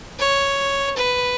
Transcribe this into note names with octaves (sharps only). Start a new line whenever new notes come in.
C#5
B4